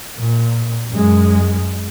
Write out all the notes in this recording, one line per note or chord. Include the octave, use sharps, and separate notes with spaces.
A#2
F#2 G#3